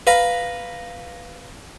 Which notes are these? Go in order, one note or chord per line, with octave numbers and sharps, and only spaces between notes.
B4 F5 A#5